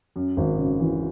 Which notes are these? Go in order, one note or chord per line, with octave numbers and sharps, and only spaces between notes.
F#2
G#1
C#3
E3